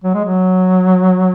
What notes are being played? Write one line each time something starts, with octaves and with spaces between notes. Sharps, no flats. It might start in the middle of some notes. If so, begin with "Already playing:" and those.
F#3
G#3
F#3